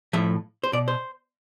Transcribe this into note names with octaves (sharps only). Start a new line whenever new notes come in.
A2 F3 E5
C5
B2 D5
C5